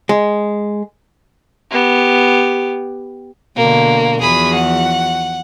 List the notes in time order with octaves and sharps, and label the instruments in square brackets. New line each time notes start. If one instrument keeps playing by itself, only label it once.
[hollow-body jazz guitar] G#3
[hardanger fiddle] B3 G4
[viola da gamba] B2 D3 [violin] A#3
[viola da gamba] E2 F3 F#4 [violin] G#4 B5
[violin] F#5